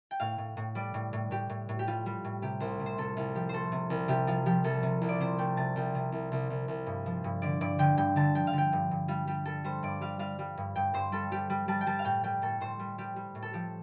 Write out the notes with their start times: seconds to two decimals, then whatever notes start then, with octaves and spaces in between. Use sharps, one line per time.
0.11 G5
0.20 A2 F5
0.38 A2
0.57 A2
0.75 G3 D5
0.94 A2
1.13 A2
1.31 A2 G4
1.50 A2
1.69 A2
1.79 G4
1.87 G3 F4
2.06 G3
2.25 A2
2.42 C3 G4
2.60 C2 C5
2.80 C3
2.86 C5
2.98 C3 A4
3.17 C2 F4
3.35 F3 G4
3.49 A3 A4 C5
3.72 C3
3.90 C2
4.08 C3 G4
4.27 F3 F4
4.46 F3 G4
4.64 C2 A4
4.83 C3
5.02 C2
5.09 D5
5.20 C3 C5
5.38 A3 G5
5.57 C3 A5
5.76 C2 G5
5.95 C3
6.12 C2
6.32 C2
6.50 C2
6.68 C2
6.87 G2
7.06 F3
7.24 G2
7.42 D3 D5
7.61 G2 D5
7.79 D3 G5
7.97 G2 G5
8.16 D3 A5
8.35 F3 G5
8.47 F5
8.53 D3 G5
8.73 G2
8.91 G2
9.08 G3 F4
9.27 G3 G4
9.46 G3 A4
9.64 G3 C5
9.83 G2 D5
10.01 G3 F5
10.19 G3 F5
10.39 G3
10.58 G2
10.76 G2 G5
10.94 G2 C5
11.12 G3 A4
11.32 G3 G4
11.50 G3
11.68 G3 A5
11.81 G5
11.87 G3 A5
11.99 F5
12.05 A2 G5
12.24 G3 G5
12.42 A2 A4
12.61 A2 C5
12.80 G3
12.98 G3 G4
13.16 G3
13.35 A2
13.43 A4
13.54 F3 G4